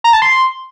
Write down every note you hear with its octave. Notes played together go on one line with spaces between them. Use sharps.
A#5
A5
C6